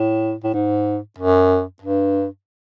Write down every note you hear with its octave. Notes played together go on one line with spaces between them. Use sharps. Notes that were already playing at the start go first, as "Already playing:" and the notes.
Already playing: A2
A2
G#2
F#2
G2